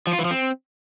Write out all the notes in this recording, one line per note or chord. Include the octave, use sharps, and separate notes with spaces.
F3
F4
E3
F3
C4